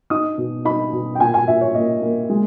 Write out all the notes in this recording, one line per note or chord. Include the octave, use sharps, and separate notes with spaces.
D#4 D#6
B2
D#4 B5
B2
G5
A#2 G#5
G#5
A#2 E5
C#5
A#3 D#5
A#3
G#3